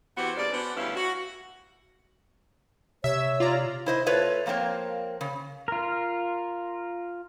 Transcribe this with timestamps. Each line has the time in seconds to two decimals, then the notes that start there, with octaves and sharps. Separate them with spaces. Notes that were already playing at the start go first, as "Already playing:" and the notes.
0.17 E3 B3 F#4 G4 C5
0.37 G2 C#3 A#3 D5
0.52 B3 C#4 D4 F#4 C5
0.76 D2 G2 C#4 E4 B4 F5
0.95 F#4
3.04 C3 C#5 E5 E6
3.40 F4 D5 A#5
3.86 E4 C5 D#5
4.06 A3 F4 B4 C#5
4.46 F3 A#3 C4 A#4 C#5
5.21 C#3
5.68 F4 A#4